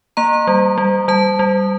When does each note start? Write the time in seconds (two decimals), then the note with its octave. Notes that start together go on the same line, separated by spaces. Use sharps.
0.17 A#3 A#5
0.47 G3
0.78 G3
1.08 G3 A5
1.39 G3